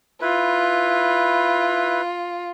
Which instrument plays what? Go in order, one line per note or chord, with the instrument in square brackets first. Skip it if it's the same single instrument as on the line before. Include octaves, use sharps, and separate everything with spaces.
[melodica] E4 B4 [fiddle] F4